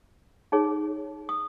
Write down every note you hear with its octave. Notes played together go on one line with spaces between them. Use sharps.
D#4 G#4 C#5
D#6